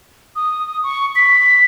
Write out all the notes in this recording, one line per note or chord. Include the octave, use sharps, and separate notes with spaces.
D#6
C#6
B6